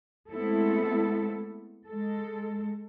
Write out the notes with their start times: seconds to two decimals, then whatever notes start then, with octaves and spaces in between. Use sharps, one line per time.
0.31 G#3 A3 B3 C4 E4 A4
1.87 G#3 A4